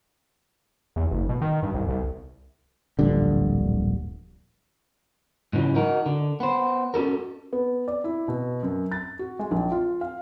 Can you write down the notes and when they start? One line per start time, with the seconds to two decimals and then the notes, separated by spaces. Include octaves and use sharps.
0.96 E2
1.11 F#1
1.29 B2
1.42 D#3
1.63 G2
1.74 C2
1.89 C2
2.99 D1 A#1 G2 D3
5.53 G#2 C#3 E3 F#3
5.75 D#4 F#4 A#4
6.06 D3
6.40 B3 C5
6.94 C#4 F#4 A4 A#4
7.53 B3
7.88 D5
8.04 E4
8.28 B2
8.63 F#2
8.92 A6
9.19 F#4
9.39 G#3
9.51 A#1
9.72 F4
10.01 F5